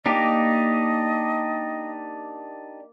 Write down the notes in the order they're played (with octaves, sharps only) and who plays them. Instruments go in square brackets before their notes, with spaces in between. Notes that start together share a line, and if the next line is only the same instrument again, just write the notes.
[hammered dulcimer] A#3 [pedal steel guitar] D4 D#4 G4 [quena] D#5